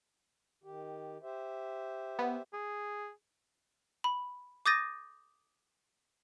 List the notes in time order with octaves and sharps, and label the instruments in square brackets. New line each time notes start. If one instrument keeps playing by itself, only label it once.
[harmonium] D#3 G4
G4 C5 E5
[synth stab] B3
[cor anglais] G#4
[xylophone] B5
D6 D#6 G6 A6 A#6 D#7